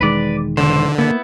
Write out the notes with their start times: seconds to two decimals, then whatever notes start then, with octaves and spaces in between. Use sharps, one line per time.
0.01 E1 D#3 G#3 B4 D5
0.57 D3 E3 C5
0.99 A#3 B3 E4